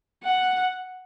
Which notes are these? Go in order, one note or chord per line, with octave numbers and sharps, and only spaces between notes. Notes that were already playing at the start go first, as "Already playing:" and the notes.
F#5